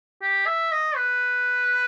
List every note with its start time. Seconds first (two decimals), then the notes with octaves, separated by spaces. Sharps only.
0.22 G4
0.46 E5
0.71 D#5
0.96 B4